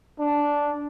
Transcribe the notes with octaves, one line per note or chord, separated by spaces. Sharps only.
D4